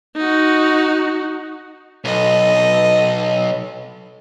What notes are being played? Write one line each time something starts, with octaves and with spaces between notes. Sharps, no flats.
D#4 F#4
B1 A4 D#5